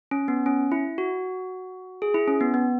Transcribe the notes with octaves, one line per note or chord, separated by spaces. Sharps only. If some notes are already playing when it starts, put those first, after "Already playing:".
C#4
B3
C#4
E4
F#4
G#4
E4
C#4
B3
B3